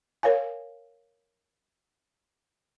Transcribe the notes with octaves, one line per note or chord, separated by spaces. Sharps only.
A#4 C#5 F5 G#5